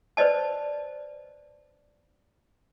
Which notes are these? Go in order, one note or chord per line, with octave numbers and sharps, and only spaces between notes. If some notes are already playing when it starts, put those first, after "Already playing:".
B4 C5 D5 D#5 A5